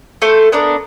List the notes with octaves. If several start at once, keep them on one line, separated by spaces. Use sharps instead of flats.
A3 A4 C5 C#6
B3 D4 A#4 D5